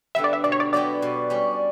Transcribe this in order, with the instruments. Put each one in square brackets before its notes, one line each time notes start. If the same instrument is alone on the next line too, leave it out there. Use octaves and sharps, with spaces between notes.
[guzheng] D3 G3 B3 [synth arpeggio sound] E5
[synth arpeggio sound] D5
E5
[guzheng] B2 [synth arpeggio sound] D5
[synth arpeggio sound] C#5
D5
[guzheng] F#3 B3 E4 G4 [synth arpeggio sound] D5
[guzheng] B2
G3 C#4